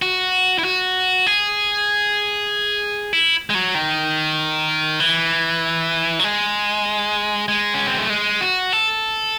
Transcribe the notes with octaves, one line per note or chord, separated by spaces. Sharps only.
F#4
E4
F#4
G#4
E4
G#3
F#3
D#3
E3
F#3
G#3
G#3
C#4
C4
A3
G#3
F#4
A4